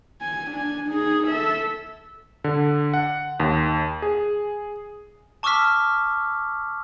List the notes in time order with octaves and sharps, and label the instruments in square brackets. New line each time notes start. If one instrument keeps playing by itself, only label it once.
[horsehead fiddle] G#5
D4 G#5
D#4 G#4
A4 E5
[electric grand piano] D3
F#5
D#2
G#4
[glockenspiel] A5 C#6 D6 E6 F6 B6